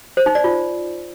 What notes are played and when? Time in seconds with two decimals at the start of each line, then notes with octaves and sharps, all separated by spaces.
0.17 C5
0.26 D#4
0.35 D5
0.44 F4